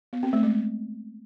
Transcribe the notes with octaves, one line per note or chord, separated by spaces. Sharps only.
B3
C4
A3
G#3